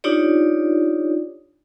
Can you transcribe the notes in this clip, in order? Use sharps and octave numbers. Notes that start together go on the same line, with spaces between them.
D4 D#4 F4 G4 C#5 D5